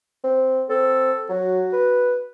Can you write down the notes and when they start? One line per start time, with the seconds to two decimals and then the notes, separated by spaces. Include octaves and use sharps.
0.24 C4
0.70 C4 A4
1.29 F#3 F#4
1.73 B4